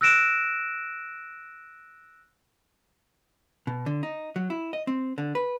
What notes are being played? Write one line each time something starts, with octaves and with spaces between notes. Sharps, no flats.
E6 F#6 A#6 D7 E7
B2
D3
D#4
F#3
E4
D#5
C4
D3
B4